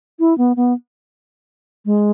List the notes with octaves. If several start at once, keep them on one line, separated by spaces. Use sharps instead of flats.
E4
B3
B3
G#3